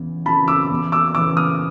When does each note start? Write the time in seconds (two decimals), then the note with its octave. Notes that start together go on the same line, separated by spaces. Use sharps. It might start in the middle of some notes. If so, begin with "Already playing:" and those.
Already playing: E2 C#3 E3
0.26 C#3 E3 A5 B5
0.48 D6 E6
0.70 E2
0.92 D6 E6
1.15 C#3 E3 D6 E6
1.37 D#6 F6